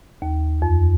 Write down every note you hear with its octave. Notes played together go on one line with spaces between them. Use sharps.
D#2
F2